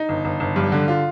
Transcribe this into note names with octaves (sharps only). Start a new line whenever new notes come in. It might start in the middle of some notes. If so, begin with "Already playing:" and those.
Already playing: D#4
G1
G1
G1
G2
D3
F4